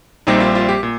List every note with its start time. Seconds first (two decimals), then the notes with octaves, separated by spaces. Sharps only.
0.27 A#1 A#2 G3 C4 D#4
0.40 F4
0.55 F4
0.69 G4
0.83 A#2